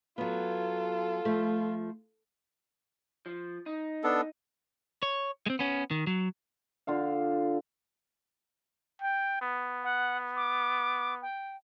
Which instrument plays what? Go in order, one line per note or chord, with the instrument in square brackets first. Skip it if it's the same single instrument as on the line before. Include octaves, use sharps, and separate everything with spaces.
[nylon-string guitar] F#3 B3 [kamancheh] F4 A4
[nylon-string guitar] F3 A3
[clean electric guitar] F3
D#4
[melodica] B3 D4 A4
[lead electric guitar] C#5
G#3 C4
B3 C#4
D#3
F#3
[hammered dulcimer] D3 F4 F5
[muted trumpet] G5
B3
[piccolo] F#5
D6
G5